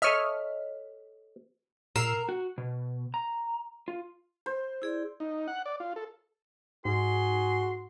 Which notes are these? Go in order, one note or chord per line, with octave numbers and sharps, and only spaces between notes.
A4 C#5 D#5 E5 F6
A#2 A#4 E6 C7 E7
F#4
B2
A#5
F4
C5
E4 G#4 D5
D#4
F#5
D5
F4
A4
G#2 F#4 G#4 C6